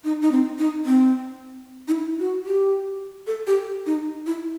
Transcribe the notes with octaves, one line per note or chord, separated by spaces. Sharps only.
D#4
D#4
C4
D#4
C4
D#4
E4
F#4
G4
A4
G4
D#4
E4